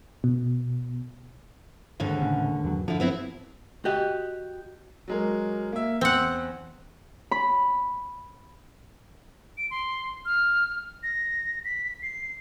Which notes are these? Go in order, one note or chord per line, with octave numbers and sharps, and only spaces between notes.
B2
D#2 G#2 D3
A2 C#3
E2 F#3
D3 F3 E4
B3 C4 E4
F#4 G4 D#5
F#3 G#3 A#4
A#3 E5
E2 C4 F#5
B5
D7
C6
F6
A#6
B6
C7